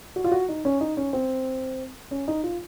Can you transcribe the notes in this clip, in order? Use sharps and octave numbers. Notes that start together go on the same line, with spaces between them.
F#4
F4
F#4
D#4
C#4
D#4
C#4
C4
C#4
D#4
F4